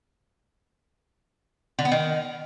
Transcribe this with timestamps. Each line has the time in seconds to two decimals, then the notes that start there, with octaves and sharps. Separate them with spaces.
1.79 D3
1.85 B3
1.92 D#3